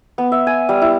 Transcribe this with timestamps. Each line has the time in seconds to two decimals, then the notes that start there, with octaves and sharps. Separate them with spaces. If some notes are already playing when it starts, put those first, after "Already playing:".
0.18 B3
0.32 E5
0.47 G#5
0.69 G3
0.82 E4